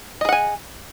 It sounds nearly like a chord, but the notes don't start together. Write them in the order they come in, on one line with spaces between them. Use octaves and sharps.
D#5 G#4 F#5 G#5